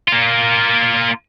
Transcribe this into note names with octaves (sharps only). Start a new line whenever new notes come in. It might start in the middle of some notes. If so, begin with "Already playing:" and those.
A#3 F4